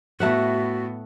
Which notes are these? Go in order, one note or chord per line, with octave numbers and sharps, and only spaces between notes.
A2 A3 B3 F#4 E5 F#5